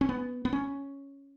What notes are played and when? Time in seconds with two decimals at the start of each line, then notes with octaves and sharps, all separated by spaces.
0.01 C#4
0.09 B3
0.45 B3
0.53 C#4